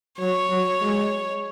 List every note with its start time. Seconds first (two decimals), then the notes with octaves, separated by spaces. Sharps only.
0.19 F#3 C#5
0.50 F#3
0.81 G#3